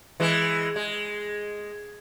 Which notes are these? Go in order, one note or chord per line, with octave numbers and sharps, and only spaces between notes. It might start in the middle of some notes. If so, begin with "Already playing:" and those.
E3 G#3
G#3